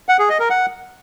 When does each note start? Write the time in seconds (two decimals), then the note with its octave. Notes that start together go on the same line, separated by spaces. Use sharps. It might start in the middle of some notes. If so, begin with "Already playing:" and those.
0.09 F#5
0.19 G#4
0.29 D#5
0.40 A#4
0.50 F#5